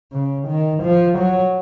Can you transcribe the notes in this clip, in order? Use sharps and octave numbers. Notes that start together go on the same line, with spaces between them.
C#3
D#3
F3
F#3